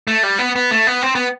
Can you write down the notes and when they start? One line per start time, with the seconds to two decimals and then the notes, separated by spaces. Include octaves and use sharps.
0.07 A3
0.23 G3
0.39 B3
0.56 B3
0.71 A3
0.87 B3
1.03 C4
1.15 B3